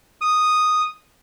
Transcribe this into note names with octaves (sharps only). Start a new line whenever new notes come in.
D#6